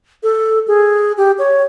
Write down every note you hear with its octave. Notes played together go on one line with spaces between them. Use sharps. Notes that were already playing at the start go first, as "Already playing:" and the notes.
A4
G#4
G4
C#5